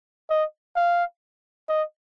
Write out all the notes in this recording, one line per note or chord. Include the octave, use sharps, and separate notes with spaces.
D#5
F5
D#5